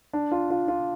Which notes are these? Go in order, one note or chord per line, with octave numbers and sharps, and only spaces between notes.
D4
F4
F4
F4